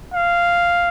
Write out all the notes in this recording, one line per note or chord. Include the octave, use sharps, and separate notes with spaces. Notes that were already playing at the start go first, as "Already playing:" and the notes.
F5